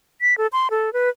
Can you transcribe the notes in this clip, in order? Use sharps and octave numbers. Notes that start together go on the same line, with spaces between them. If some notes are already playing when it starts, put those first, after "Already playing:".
B6
A4
C6
A4
B4